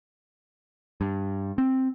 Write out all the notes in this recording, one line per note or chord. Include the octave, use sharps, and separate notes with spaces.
G2
C4